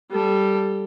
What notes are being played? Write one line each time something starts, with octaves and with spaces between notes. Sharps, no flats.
G3 A4